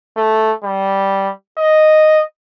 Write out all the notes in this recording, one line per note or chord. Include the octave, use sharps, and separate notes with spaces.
A3
G3
D#5